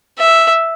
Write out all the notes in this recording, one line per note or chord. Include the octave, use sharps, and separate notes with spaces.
E5